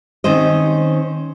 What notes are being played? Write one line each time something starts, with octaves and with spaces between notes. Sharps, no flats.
D#3 C4 C#4 C5 D#5